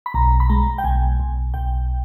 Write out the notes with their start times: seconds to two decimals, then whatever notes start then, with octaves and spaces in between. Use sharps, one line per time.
0.06 B5
0.14 B1 A#5
0.40 B5
0.49 G#3 A#5
0.78 G5
0.84 B1 G#5
1.20 B1
1.54 B1 G5